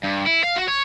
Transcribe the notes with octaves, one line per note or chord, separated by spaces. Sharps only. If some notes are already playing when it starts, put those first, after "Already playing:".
G2
E4
F5
F#4
C#5